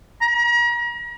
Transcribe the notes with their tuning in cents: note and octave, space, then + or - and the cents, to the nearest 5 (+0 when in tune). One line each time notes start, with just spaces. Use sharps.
A#5 +40